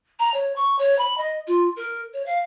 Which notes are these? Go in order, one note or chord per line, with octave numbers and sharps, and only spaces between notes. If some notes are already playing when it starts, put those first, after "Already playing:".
A#5
C#5
C#6
C#5
B5
D#5
F4
A#4
C#5
F5